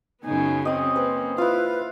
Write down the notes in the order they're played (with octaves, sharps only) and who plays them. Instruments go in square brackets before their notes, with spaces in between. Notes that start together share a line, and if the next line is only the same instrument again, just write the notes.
[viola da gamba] F#2 C#3 B3 [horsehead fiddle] D#4 G#5
[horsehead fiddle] C4 C#4 [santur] D#5 D#6
[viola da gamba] A#3 [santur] B4 C5
[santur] E4 F4 [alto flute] B4 [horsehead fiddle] F5